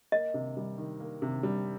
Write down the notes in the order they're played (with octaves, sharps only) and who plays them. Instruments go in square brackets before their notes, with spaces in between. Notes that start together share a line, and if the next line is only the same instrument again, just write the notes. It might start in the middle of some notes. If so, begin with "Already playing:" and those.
[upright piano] A#3 [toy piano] D#5
[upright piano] C3
G3
D#3
A#3
C3
G3